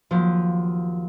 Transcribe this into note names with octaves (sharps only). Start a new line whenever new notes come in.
D#2 F3 F#3